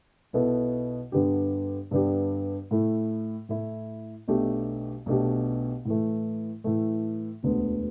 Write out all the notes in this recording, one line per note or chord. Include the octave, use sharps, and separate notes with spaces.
B1 B2 B3 E4 A4
G2 D3 B3 D4 G4
G2 D3 B3 D4 G4
A2 A3 E4
A2 A3 E4
B1 B2 A3 D4 G4
B1 B2 A3 D4 G4
A2 E3 A3
A2 E3 A3
E1 D2 D3 B3